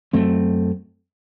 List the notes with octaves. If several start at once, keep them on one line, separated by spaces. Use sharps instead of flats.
F#2 F#3 A3 C4